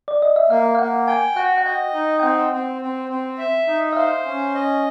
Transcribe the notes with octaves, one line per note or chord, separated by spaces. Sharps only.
D5
D#5
E5
A#3 F5
F5
A#3 F#5
G5 G#5
F#4 F#5
F#5
D#5 G5
D#4
G5
C4 F#5
C4
C4
C4
E5
D#4
E5
C5 F5
C#4
D#5